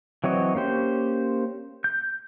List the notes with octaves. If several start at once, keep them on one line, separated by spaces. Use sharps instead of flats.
E3 F#3 C4 C#5 D#5
A#3 C#4 G4 C5
G6